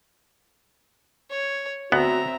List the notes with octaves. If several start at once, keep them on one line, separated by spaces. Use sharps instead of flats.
C#5
D2 B3 C4 F#4 E5 A#5